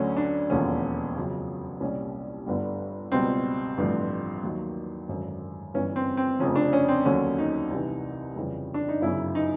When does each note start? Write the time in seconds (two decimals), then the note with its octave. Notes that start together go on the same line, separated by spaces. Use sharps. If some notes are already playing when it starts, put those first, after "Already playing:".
Already playing: D2 D3 F#3 C#4
0.17 D4
0.50 E1 D#2 D3 F3 C#4
1.16 F2 C#3 F#3
1.80 C2 A#2 G3 C#4
2.46 G1 G2 D3 G3
3.12 C#2 B2 G3 C4
3.78 A1 G2 D3 F3
4.43 D#2 D#3 F#3
5.09 G#1 F#2 D3
5.74 G1 G2 E3 C#4
5.96 C4
6.17 C4
6.39 F1 F2 C#3 F3 C#4
6.56 D4
6.73 C#4
6.88 C4
7.05 D#2 D3 F#3 C#4
7.38 D#4
7.71 C2 C3 E3
8.36 F2 C#3 E3 G3
8.74 D4
8.89 D#4
9.01 G1 F#2 C#3 F#3 E4
9.35 D#4